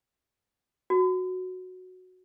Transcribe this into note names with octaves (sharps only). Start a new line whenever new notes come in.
F#4